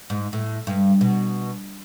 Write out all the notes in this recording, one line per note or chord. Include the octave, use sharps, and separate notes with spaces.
G#2
A2
G2
B2